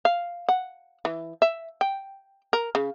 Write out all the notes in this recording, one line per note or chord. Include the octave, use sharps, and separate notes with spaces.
F5
F#5
E3
E5
G5
A#4
C#3